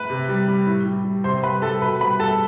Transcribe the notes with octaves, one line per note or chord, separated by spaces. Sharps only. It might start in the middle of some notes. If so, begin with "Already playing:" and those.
Already playing: B4 B5
C3
G3
G3
A2
G3
G3
C3 C5 C6
G3 B4 B5
G3 A4 A5
B2 B4 B5
G3 B4 B5
G3 A4 A5